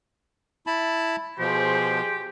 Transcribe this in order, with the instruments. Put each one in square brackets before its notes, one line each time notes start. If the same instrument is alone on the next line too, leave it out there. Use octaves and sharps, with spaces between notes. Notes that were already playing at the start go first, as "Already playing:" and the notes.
[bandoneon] E4 A5 B5
[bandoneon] B2 F3 [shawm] G4 [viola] G#4 C5